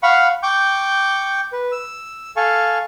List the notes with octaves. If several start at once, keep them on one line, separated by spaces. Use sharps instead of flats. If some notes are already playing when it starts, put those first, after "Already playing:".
F5 F#5 B5 C#6
G5 C#6 D6 G6
B4
E6
A4 F5 G#5 A5 C#6